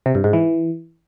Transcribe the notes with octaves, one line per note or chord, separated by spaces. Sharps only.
C3
G2
G#2
E3